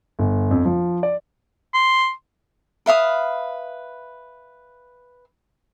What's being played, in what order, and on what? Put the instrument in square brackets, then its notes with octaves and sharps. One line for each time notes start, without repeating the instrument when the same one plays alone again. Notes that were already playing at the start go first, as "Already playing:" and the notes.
[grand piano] G1
F2
F3
D5
[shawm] C6
[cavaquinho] B4 E5 F5 D#6